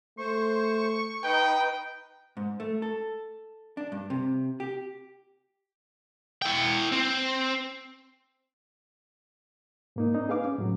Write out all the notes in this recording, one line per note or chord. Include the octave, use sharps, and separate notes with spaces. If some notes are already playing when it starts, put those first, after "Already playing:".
A3 C5 C#6
D#4 B4 G5
G#2
A3
A4
D4
G2
C3
G4
E4 G5
C4
G#2 A#3 D#4
C4 D4 D#4
G#4 B4 F5 D6
C#4
A2 F#3